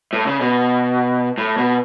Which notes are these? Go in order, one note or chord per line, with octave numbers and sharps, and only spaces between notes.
A2
C#3
B2
A2
B2